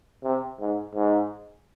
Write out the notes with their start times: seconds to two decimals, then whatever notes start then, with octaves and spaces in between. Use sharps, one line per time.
0.24 C3
0.60 G#2
0.95 G#2